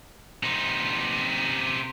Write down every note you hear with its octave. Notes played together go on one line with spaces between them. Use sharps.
C3 D#4